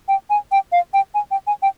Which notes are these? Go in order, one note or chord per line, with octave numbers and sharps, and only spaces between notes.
G5
G#5
G5
F5
G5
G#5
G5
G#5
G5